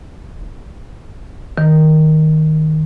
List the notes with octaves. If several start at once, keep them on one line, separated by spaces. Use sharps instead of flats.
D#3